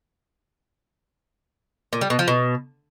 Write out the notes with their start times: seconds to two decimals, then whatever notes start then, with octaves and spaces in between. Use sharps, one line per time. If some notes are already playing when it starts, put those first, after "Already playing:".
1.93 A#2
2.01 G3
2.10 B2
2.19 F3
2.28 B2